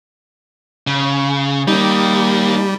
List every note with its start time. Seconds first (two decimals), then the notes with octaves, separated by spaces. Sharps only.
0.87 C#3
1.68 G3 A#3 D#4